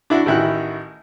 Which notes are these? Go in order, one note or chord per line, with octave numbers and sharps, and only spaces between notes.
D4 E4 F#4
A1 D#3 E4 F#4 F#6